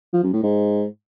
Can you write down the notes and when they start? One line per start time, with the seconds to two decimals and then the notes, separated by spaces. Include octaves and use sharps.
0.13 F3
0.23 F#2
0.33 A2
0.43 G#2